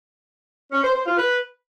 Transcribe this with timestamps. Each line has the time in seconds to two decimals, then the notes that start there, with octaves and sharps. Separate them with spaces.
0.72 C#4
0.83 C5
0.95 C5
1.06 F4
1.17 B4